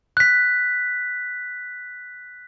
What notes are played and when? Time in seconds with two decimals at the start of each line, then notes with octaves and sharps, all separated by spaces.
0.17 F#6 B6